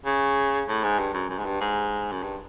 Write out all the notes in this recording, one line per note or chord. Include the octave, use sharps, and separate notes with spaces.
C#3
A2
G#2
G2
F#2
F#2
G#2
G2
G#2
F#2
G2